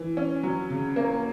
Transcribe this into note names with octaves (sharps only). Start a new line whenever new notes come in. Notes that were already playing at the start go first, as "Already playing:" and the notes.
Already playing: E3
C#4
F#3
C#3
A#3